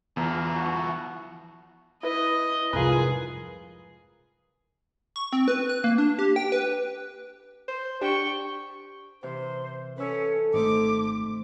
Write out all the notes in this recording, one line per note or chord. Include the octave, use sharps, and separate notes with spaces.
E2 E3 F3 A#4
F#4
E4 B4 D#5
C2 F2 G#2 F3 F4 G#4 A#4 B4
C#6
C4
B4
F#6
A#3
D4
G4
G5
B4
C5
D4 G4 G5 C#6
C3 E3 C5 G6
C#4 A4 B4 E6
G#1 A3 C4 D#4 D6